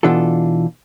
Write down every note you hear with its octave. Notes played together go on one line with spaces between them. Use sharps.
B2 E3 D4 F4 A4